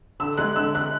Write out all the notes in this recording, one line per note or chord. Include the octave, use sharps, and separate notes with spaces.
D3 E6
G#3 F#6
D3 E6
F#6